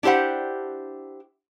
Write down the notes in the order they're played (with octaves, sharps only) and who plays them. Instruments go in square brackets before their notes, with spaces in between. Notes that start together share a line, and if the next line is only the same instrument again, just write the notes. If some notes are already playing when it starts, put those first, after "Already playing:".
[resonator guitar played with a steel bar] D4 E4 G4 C5 F#5